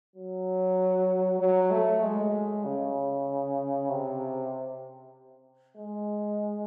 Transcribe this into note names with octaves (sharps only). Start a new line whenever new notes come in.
F#3
F#3
A3
G#3
C#3
C3
G#3